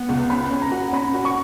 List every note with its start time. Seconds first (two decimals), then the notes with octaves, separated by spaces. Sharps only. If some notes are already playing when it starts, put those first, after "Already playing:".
Already playing: B3
0.09 C#2
0.30 C#4 B5
0.51 C#4
0.62 A#5
0.72 F#4
0.93 C#4 B5
1.14 F#4
1.25 C#6